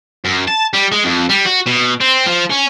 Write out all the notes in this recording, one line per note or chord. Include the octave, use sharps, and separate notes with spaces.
F#2
A5
G3
G#3
F2
G3
F#4
B2
C4
F3
C#4